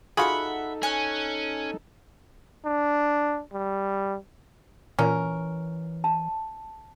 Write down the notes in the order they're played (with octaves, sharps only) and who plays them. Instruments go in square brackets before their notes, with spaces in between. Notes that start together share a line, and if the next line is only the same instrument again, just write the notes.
[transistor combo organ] D#4 A4 [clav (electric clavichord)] F4 F#4 G#4 [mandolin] E5 F#5 B5
[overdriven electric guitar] C#4 [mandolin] G#5 F#6
[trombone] D4
G3
[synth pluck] A#2 [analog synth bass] E3 [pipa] C#4 A#4
[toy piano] A5